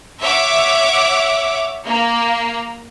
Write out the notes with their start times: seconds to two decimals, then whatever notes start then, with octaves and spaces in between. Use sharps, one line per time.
0.21 C#5 E5 F#5 D6
1.85 A#3